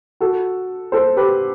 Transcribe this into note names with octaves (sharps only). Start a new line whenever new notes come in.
F#4 A4
A4 C5
G4 B4